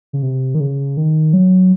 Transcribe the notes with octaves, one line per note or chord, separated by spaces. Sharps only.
C#3
C3
D#3
C#3
D#3
F#3